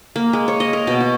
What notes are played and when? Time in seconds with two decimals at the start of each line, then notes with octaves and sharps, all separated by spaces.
0.16 A#3
0.33 G#3
0.48 C#5
0.60 D#5
0.73 A#4
0.87 B2
1.01 F#4